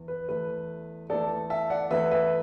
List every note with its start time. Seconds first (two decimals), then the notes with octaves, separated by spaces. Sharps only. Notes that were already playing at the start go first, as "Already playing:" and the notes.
Already playing: E2
0.08 B4
0.28 E2 E3 A3 B4
1.10 E2 E3 A3 A4 D5
1.50 E5 A5
1.70 D5 F#5
1.91 E2 E3 A3 B4 E5
2.11 B4 E5